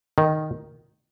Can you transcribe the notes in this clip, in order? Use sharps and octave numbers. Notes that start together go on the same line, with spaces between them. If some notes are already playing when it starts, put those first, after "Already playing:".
D#3